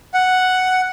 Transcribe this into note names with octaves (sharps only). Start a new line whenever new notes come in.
F#5